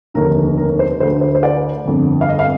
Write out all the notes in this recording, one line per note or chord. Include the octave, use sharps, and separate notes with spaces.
F1 D#2 D3 A#4
A#4
C5
D2 D3 C5
C5
C5
D5
G1 F2 D3
F5
D#5
F5